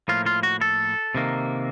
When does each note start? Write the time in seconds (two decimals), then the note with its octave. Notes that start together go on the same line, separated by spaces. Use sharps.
0.08 A2 F3 A#3 F4
0.26 F4
0.43 F#4
0.61 A4
1.15 C3 D#3 A#3